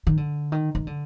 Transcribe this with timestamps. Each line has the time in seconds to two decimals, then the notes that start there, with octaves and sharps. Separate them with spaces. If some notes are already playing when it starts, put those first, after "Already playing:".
0.07 D#3
0.17 D3
0.52 D#3
0.75 D#3
0.87 D3